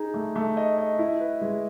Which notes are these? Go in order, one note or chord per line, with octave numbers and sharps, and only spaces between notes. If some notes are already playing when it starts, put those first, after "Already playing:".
Already playing: D#4 G#4
A3
A3
D#5
D#5
E4
B4
G#3